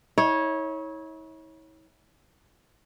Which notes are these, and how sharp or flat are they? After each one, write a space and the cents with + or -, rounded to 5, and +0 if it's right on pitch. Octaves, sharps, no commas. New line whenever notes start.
E4 -45 C#5 -10